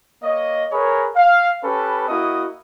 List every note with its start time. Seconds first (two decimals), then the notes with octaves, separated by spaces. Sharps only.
0.23 A#3 C#5 D#5
0.72 G#4 A#4 B4 C#5 B5
1.16 F5
1.64 C#4 G4 A4 B4
2.08 A#3 E4 F#4 D#5 D#6